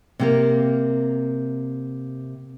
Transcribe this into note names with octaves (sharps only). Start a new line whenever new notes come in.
C3 A#3 A#4